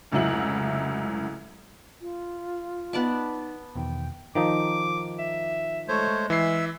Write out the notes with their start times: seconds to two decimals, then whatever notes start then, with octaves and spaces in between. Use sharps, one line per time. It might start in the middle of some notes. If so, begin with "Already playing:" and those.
0.12 F1 C#2 G#2 F#3 E4 F#7
2.01 F4
2.93 B3 D#4 D5 A5
3.75 E2 B2 D#3 G5
4.35 D#3 F3 D#4 D6
5.19 E5
5.88 G#3 A3 C5 C#5
6.30 E3 E5 C7